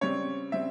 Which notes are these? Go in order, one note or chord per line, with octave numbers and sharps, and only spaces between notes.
C#3 G3 C4 C#5
C#3 G3 C4 E5